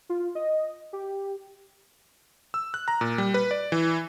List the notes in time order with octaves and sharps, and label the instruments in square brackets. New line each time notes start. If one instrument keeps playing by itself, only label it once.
[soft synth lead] F4
D#5
G4
[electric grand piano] E6
F#6
A#5
A#2
G3
B4
D5
E3